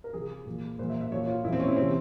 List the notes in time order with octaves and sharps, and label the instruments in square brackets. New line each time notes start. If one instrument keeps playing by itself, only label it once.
[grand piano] A#4
C3 F3 G#4
A#2 F3
A#2 F3 C5
E5
E5
A#2 F3 C#5
F4
A#2 E4
F3 C4
C#4
E4
C3 E3 C4